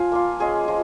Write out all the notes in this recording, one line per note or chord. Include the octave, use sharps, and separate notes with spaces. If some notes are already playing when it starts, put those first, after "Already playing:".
Already playing: F3 F5 G#5
A#3 F4
G#3 C#4 F4 G#4
F3 G#3